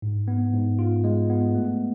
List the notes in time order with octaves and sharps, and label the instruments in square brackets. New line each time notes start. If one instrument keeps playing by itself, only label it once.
[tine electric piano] G#2
B3
G#2
F4
G#3
B3
A3